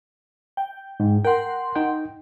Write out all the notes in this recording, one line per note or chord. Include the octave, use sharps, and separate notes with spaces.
G5
G#2
A#4 F#5 G5 C6
D#4 G5